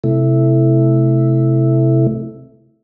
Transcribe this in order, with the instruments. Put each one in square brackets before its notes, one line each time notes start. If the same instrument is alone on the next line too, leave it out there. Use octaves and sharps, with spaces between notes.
[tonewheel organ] C3 A3 E4